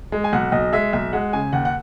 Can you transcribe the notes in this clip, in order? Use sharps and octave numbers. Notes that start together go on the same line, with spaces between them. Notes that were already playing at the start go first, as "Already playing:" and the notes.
G#3
G#5
B1 F#5
B1 D#5
G#3 E5
B1 E5
G#3 F#5
C#3 G#5
D#2 F#5
F#5